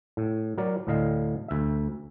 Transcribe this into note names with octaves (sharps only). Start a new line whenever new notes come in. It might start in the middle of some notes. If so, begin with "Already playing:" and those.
A2
F#3 A#4 D5
D2 A2 D3 D#5 F5
D2 E5